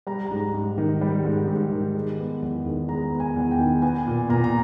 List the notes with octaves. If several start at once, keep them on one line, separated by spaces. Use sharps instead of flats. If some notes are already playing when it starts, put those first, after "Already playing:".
G3 A#5
G#2 A#5
G#2
D#3
G3
G#2
G#2
D#3
G#3
B3
E2
D#3
G#3 A#5
B3
G#5
E2
G5
D#3
B3 G#5
A#2
A#2 A#5
A#5